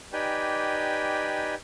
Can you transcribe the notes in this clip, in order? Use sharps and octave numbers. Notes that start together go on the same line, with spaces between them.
D#4 G4 B4 D5 G5 G#5